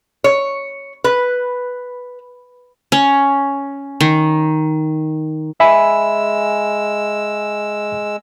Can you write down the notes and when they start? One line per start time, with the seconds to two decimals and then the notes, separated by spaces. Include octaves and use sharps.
0.24 C#5
1.04 B4
2.92 C#4
4.01 D#3
5.60 G#3 E5 G#5 B5 E6